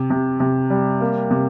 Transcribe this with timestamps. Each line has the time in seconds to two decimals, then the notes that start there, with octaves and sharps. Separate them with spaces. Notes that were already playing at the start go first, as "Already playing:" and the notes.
Already playing: C3
0.10 C3
0.40 C3
0.70 G3
1.00 A#3
1.31 C3